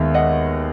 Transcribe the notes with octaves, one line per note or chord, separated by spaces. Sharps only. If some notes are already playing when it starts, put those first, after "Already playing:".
Already playing: D#2 D#3 G#3 B3 E5
D#5 F#5